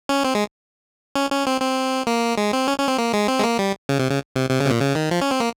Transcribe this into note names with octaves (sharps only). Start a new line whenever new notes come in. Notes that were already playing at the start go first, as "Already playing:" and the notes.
C#4
C4
G#3
C#4
C#4
C4
C4
A#3
G#3
C4
C#4
C#4
C4
A#3
G#3
C4
G#3
A#3
G3
C#3
C3
C#3
C3
C3
C#3
C3
A#2
C#3
D#3
F3
C#4
C4
A#3